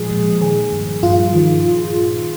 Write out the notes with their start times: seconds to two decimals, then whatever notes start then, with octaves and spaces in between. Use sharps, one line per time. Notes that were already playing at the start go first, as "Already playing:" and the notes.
Already playing: A#2 F3 G#3 G#4
0.11 A#2
0.41 D#3 G#4
0.73 G2
1.03 G2 F4
1.34 D#3